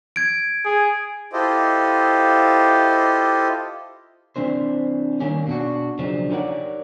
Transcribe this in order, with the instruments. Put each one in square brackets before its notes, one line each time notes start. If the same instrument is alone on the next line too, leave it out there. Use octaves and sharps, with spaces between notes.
[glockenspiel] G#6 D7
[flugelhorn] G#4
[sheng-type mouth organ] E4 F4 G4 A4 C5 D#5
[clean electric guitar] C3 E3 F#3 C#4 D4 C5
D#3 G3 A#3 C#4
B2 D4 F#4
B1 C#3 F3 F#3 D4 D#4
D#4 G4 A#4 C#5 D5 F#5